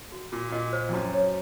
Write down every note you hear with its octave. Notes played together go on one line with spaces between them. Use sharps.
F#4
A#2 F#4
A#2 D#5
C5
F2
F#2 F#4
C#5